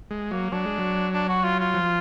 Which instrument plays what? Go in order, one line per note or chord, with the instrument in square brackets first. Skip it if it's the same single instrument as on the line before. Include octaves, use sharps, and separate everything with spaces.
[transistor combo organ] G#3
[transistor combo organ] F#3 [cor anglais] A#3
[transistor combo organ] F#3 [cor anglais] D4
[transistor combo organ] G#3
F#3
[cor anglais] D4
F#4
F4
F4
[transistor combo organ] F3